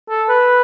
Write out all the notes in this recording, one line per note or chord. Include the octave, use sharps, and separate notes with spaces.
A4
B4